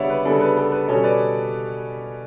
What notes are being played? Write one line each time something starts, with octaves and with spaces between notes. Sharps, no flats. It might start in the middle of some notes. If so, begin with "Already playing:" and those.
Already playing: C#3 G3 B3 D4 C#5 D5 E5 F#5
B4
C#3 G3 B3 D4 A4
B4
A4
B4
B2 G3 C#4 A4 C#5
B4 D5